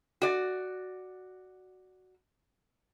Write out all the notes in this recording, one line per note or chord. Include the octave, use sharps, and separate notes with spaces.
F#4 D5